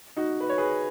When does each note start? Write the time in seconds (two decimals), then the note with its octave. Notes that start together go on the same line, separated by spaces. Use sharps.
0.16 D#4 F#4
0.41 B4
0.49 C#5
0.58 G#4 B4